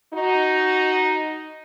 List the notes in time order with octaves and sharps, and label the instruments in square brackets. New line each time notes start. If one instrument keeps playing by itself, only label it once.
[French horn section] D#4 F#4